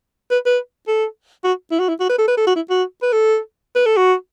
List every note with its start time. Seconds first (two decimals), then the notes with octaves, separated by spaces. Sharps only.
0.30 B4
0.46 B4
0.88 A4
1.44 F#4
1.71 E4
1.79 F#4
1.89 E4
2.00 F#4
2.09 B4
2.18 A4
2.28 B4
2.37 A4
2.47 F#4
2.56 E4
2.70 F#4
3.02 B4
3.12 A4
3.75 B4
3.86 A4
3.97 F#4